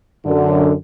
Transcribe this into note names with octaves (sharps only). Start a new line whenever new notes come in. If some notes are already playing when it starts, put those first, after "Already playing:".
F#2 D3